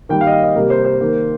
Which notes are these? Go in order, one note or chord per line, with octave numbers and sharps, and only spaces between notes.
D#3 G3 A#3 G5
F5
D#5
F5
D#5
C3 G3 A#3 A#4
C5
C5
D#3 A#3